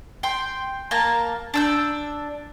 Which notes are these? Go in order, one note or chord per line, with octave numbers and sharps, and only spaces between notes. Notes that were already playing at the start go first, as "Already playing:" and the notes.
G5 C6
A#3 A5 A#5
D4 E6 G6